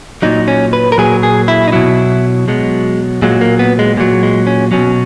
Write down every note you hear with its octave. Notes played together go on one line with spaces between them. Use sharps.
A#2 F#3 D#4
C#4
B4
A#4
A#2 F#3 G#4
G#4
E4
D#4
B2 F#3 E4
B2 F#3 G#3
A#2 F#3 G#3
A#3
B3
G#3
A#2 F#3
G#3
C#4
B2 F#3 C#4